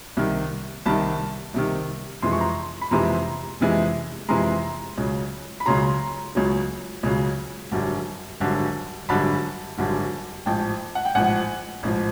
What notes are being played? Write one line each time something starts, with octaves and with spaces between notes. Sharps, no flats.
C2 C3 D#3
C2 C3 D#3 A5 B5
C2 C3 D#3
F2 C3 E3 G#3 C6
C#6
A#5 C6
B5
F2 C3 E3 G#3 A#5 C6
F2 C3 E3 G#3
F2 C3 E3 G#3 A#5 C6
C#2 C#3 F#3
B5
C#2 C#3 F#3 A#5 C6
C#2 C#3 F#3
C#2 C#3 F#3
G#1 F#2 D3 G3
G#1 F#2 D3 G3
G#1 F#2 D3 G3 A5 B5
G#1 F#2 D3 G3
A1 G#2 F3 G5 A5
F#5
G5
A1 G#2 F3 F#5 G#5
A1 G#2 F3